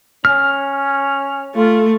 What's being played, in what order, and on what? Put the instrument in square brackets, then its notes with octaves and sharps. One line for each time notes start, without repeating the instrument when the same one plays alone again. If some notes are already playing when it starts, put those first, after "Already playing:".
[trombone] C#4 [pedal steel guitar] F6
[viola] A3 [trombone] F4